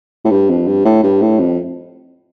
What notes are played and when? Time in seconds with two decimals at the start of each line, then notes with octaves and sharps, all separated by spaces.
0.25 A2
0.31 G2
0.50 F2
0.67 G2
0.85 A2
1.04 G2
1.22 A2
1.40 F2